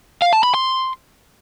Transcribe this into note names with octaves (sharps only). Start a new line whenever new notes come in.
F5
A5
B5
C6